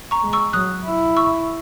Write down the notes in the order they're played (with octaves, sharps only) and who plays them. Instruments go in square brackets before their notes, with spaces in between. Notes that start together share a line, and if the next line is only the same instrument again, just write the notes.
[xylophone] A#5 C#6
[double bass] G#3
[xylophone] C#6 E6
[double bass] F#3 [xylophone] D#6 F#6
[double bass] E4
[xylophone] C#6 E6